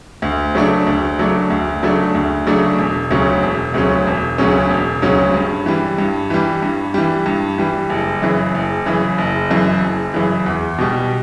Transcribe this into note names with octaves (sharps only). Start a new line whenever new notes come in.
D2
C#3 F#3 A3 D4
D2
C#3 F#3 A3 D4
D2
C#3 F#3 A3 D4
D2
C#3 F#3 A3 D4
E1
D2 C#3 F#3 C#4
E1
D2 C#3 F#3 C#4
E1
D2 C#3 F#3 C#4
E1
D2 C#3 F#3 C#4
G2
E3 G3
G2
E3 G3
G2
E3 G3
G2
E3 G3
F#1
F#2 C#3 E3
F#1
F#2 C#3 E3
F#1
F#2 C#3 E3
F#1
F#2 C#3 E3
E2
B2 G3